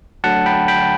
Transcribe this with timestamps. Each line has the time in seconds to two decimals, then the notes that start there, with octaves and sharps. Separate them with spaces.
0.24 D2 D3 F#3 F#5 A5
0.46 G5 B5
0.68 G5 B5